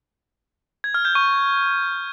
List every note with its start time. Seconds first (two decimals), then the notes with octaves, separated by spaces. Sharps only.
0.84 G#6
0.94 F6
1.05 G6
1.15 C#6